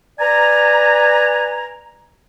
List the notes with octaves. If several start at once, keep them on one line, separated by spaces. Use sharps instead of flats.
B4 D5 G#5 A#5